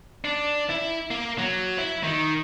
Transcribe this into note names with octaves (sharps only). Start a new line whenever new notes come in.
D4
E4
A#3
F#3
E4
D#3